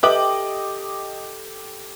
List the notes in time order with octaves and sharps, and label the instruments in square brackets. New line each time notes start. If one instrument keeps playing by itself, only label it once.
[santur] G4 A4 G5 [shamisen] B4 E5 [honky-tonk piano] D#5 D6 F#7